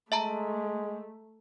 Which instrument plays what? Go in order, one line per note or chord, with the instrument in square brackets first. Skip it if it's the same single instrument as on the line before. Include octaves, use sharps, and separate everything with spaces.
[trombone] G#3 [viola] A3 [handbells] E5 A5 A#5